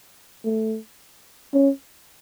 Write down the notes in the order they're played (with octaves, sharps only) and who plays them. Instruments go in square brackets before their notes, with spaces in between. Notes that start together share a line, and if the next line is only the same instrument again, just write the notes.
[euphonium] A3
C#4